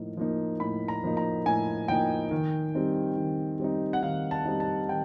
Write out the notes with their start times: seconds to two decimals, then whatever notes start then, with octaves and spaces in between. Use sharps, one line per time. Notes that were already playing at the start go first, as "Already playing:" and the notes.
Already playing: A2 F3 A#3 D#4
0.17 F3 A#3 D#4
0.60 A2 B5
0.88 A#5
1.04 F3 A#3 D#4
1.17 A#5
1.46 A2 G#5
1.88 F3 A#3 D#4 G5
2.31 D#3
2.75 G3 C4 D#4
3.18 D#3
3.60 G3 C4 D#4
3.93 F#5
4.02 D#3 F5
4.31 A5
4.45 G3 C4 D#4
4.60 A5
4.88 D#3 G5